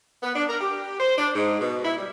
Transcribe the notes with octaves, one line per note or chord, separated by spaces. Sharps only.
B3
D4
A#4
G4
C5
D4
G#2
B2
E4
G3